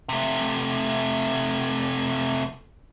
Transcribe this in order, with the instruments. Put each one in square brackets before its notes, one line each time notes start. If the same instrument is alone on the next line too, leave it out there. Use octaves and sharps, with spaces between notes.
[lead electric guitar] C3 A3